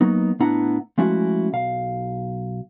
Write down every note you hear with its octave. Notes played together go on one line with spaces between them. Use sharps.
F#3 A#3 B3 D#4
A2 B3 D4 E4 F#5 A#5
F3 G#3 A3 C#4 E4 F#4
B1 F5